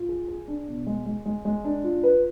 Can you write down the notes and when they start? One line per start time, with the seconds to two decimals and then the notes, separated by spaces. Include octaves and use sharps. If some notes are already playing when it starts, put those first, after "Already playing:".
Already playing: F4
0.09 G#4
0.28 G#4
0.48 D4
0.67 B2
0.87 G#3
1.06 G#3
1.26 G#3
1.45 G#3
1.64 D4
1.84 F4
2.03 B4